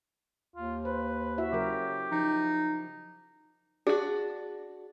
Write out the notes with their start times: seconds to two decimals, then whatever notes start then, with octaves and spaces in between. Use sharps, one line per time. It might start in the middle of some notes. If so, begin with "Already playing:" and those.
0.56 D#2 F4
0.85 B4 C5
1.38 E4 F#4 E5
1.52 C#3 F#3 G4 A#4
2.12 F3 D#4
3.87 D4 F#4 G#4